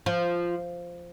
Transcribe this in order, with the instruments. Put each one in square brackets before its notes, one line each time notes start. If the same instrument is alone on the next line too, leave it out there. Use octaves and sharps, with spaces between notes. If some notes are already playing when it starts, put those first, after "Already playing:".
[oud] F3